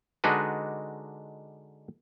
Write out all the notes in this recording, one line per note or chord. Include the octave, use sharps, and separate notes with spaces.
D3 G#3 D4 D#4 F#4 B4